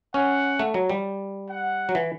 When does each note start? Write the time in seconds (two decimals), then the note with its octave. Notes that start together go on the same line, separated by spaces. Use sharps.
0.14 C#4 F#5
0.59 A3
0.74 F#3
0.90 G3
1.49 F#5
1.89 F#3
1.95 E3